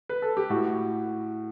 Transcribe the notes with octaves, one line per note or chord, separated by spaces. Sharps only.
B4
A4
G4
A2 F#4